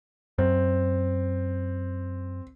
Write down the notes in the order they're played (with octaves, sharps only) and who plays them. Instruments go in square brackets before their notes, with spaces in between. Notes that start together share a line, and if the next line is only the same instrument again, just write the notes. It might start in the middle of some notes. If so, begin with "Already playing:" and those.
[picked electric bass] F#2 [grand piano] C4